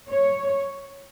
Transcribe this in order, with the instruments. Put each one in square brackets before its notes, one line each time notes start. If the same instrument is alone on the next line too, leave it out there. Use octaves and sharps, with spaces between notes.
[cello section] C#5